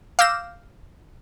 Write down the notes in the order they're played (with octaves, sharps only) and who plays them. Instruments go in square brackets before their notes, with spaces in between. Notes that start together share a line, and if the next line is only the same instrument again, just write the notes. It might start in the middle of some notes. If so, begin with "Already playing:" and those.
[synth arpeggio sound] F5 D6 E6 G6 A#6 E7